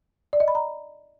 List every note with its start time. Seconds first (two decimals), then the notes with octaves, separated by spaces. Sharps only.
0.33 D5
0.40 D#5
0.48 B5
0.55 A#5